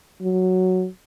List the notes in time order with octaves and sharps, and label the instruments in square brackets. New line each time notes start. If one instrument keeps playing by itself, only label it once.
[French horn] F#3